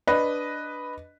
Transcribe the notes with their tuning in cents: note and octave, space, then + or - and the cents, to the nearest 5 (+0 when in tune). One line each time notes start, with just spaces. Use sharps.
D4 +0 B4 +0 D#5 +0